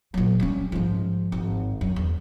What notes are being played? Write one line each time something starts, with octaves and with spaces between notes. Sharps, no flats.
A#2 F#3
G3 C#4
G#2 F3
G#1
F#2
E2